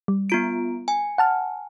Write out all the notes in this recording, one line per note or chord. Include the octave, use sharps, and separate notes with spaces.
G3
B3 F4 D7
G#5
F#5 A5 F6